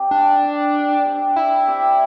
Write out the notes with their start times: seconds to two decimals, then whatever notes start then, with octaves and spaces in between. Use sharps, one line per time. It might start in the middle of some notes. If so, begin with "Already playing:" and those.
Already playing: C4 G4 D5
0.11 G3 D4
0.42 C4 G4 D5
0.74 G3
1.05 C4 G4 D5
1.36 G3 E4
1.67 C4 G4 D5